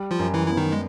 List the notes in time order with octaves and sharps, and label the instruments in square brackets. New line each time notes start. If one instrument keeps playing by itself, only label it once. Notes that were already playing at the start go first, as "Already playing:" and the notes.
Already playing: [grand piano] G3
[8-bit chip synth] F3 F4
[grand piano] F#2
[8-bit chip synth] E3 E4
[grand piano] B3 [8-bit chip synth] E4
[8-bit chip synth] D#3 D#4
G#3